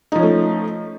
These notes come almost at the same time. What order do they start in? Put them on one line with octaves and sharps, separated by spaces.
D#4 F3 C#4 A3